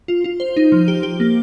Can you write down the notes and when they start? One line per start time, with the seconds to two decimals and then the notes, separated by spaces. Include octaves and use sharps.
0.08 F4
0.24 F4
0.40 C5
0.56 D#4
0.72 F3
0.88 G4
1.03 G4
1.20 A#3